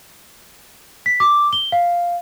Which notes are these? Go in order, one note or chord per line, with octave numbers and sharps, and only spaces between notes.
B6
D6
G7
F5